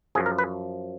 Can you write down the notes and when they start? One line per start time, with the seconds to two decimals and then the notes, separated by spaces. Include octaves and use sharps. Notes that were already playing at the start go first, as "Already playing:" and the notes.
0.15 F#2 F3 G#4
0.26 A#4
0.38 B4